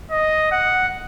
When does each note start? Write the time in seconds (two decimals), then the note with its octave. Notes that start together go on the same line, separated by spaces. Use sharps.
0.11 D#5
0.51 F#5